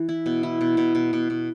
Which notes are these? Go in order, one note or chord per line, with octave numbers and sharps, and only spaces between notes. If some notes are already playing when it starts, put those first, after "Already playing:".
Already playing: E3
E4
B2
E4
B2
B2
B2
B2
B2